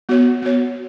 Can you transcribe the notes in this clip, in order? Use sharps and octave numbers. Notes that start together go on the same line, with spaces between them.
B3 F#4 C#5
B3 F#4 C#5